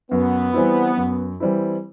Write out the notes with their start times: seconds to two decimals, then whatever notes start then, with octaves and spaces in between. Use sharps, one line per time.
0.11 F#2 B3
0.53 E3 G3 C4 E4
0.97 F#2
1.40 E3 G3 C4 E4